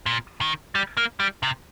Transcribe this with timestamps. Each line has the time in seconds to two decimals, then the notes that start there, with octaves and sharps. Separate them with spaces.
0.06 A#2
0.41 D#3
0.75 G3
0.97 A#3
1.20 G3
1.43 C3